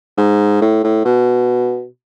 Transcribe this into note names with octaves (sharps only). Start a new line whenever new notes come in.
G#2
A2
A2
B2